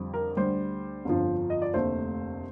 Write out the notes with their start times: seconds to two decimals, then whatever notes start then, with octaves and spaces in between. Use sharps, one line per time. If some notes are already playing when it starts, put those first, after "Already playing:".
Already playing: F2 D3 G3
0.14 A#4
0.37 D2 D3 G3 C5
1.05 G1 F2 D3 F3
1.50 D#5
1.62 D5
1.74 F1 D#2 D3 A3 C5